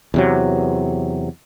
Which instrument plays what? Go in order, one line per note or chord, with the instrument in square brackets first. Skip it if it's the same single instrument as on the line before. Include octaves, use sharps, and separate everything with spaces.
[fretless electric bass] E2 C3 F#3